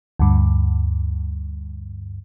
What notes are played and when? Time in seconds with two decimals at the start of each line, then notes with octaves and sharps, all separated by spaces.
0.19 D2 G2